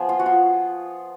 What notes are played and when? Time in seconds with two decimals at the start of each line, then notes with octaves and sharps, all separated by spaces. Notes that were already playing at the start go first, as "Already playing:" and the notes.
Already playing: F3 B3 G#4
0.09 F4
0.19 F#4
0.26 F4